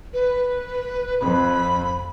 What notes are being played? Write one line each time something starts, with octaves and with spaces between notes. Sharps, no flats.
B4
F2 B5